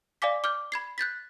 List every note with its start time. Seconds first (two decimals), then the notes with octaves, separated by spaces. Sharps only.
0.22 D5 F5 G#5 D6 B6
0.44 D6 F6 G6
0.72 B5 G#6 C7
0.98 F#6 G6 A6 B6